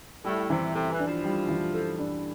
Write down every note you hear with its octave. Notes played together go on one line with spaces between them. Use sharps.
A2 G3
C3 E3
C3 A4
E3
D4
F3
G3
E3
A4
D4